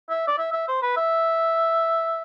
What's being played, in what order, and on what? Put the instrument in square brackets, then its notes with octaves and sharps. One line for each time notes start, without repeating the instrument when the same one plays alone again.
[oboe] E5
D5
E5
E5
C5
B4
E5